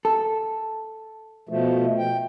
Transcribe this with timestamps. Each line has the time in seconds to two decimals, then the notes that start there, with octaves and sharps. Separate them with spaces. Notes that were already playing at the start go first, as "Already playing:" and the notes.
0.05 A4
1.49 B2 F3 A3
1.98 G5